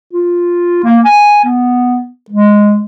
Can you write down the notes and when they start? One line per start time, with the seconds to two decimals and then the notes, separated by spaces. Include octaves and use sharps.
0.13 F4
0.84 A#3
1.05 G#5
1.45 B3
2.30 G#3